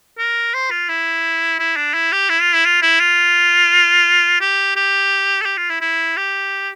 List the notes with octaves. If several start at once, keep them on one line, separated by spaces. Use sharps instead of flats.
A#4
C5
F4
E4
E4
D4
E4
G4
E4
F4
E4
F4
E4
F4
G4
G4
A4
G4
F4
E4
E4
G4